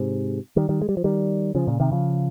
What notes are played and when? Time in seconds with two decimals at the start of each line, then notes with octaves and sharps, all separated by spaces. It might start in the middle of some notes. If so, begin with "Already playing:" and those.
Already playing: G#2 C3
0.56 D#3 G3
0.69 D#3 G3
0.82 G#3
0.89 G3
0.97 F3
1.04 D#3 G3
1.55 C#3 F3
1.67 A#2 C#3
1.80 C3 D#3
1.92 C#3 F3